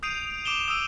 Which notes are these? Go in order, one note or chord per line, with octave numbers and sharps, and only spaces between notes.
D#6 G6 C7 D7 D#7 F7
D6 D7 E7 F7 G7
D#6 E6 D#7